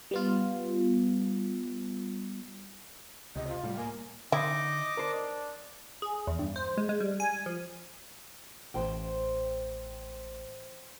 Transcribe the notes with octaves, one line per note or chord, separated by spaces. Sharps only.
G3 B3 F4
C#2 C3 D#5
F4
A2 G3
A#3 G#5
D3 D#4 E4 D#5 C6 D6
D4 A#4 C5
G#4
E2
G2
C5
G#3
G#3
G3
G#5
F3
A1 C5 G5